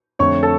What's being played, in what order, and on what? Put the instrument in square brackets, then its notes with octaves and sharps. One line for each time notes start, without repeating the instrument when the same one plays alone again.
[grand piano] F2 D3 A3 C#5 C#6
A4 A5